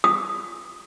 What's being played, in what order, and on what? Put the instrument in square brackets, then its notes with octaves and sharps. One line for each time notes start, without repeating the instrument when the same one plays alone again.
[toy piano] D#6